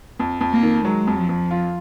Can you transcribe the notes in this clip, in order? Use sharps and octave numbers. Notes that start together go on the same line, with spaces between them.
F2
F2
A#3
D#3
F#3 G#3
F2
F3
F2
F4